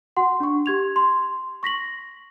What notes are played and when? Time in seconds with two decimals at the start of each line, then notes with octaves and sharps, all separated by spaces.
0.17 F#4 F#5 C6
0.40 D4 C#6
0.66 G4 G#6 F7
0.96 C6
1.63 C#6 A#6 B6 F#7